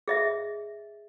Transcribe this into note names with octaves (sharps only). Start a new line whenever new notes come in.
G#4 D#5 E5